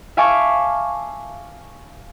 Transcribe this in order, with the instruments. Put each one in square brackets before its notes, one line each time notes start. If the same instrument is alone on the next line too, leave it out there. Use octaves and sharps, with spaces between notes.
[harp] E5 F5 G#5 A5 C#6 D6